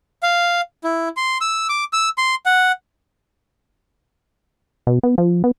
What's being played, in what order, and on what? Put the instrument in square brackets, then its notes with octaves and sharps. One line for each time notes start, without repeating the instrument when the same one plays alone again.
[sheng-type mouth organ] F5
E4
C6
E6
D6
E6
C6
F#5
[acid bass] B2
B3
F3
B3